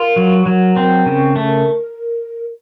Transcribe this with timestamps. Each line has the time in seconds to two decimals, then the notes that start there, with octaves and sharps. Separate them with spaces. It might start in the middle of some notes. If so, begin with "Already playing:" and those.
Already playing: F4 A#4
0.16 F#3
0.46 F#3
0.76 C4
1.06 C#3
1.36 A3